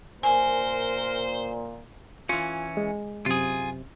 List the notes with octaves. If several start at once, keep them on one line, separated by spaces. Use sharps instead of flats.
A#2 A#4 C5 G#5
E3 C#4 F4
G#3
F#2 C3 F4 G#4